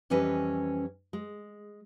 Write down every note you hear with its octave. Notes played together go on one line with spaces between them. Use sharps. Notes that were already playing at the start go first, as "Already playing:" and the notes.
F2 E3 G3 C#4 B4 D#5
G#3